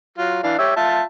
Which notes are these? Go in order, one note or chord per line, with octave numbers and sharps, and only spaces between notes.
F#3 F4
E3 D4 F5
G4 C#5 E5
F4 E5 A5